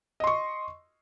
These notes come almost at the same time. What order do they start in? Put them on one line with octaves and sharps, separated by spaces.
D#5 C6 C#6